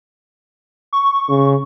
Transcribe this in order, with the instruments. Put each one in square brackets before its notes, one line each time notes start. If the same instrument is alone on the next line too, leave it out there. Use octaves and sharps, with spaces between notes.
[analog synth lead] C#6
[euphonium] C#3